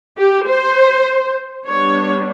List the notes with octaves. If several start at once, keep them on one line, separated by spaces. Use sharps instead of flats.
G4
C5
G3 B3 D4 C#5